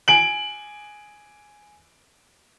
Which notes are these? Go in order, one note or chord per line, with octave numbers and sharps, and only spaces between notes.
G#5 D7 F#7